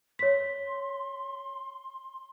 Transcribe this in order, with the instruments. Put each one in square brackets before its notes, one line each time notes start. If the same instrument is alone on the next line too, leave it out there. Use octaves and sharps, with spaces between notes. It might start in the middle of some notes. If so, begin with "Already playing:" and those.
[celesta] C#5 B6 [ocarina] C6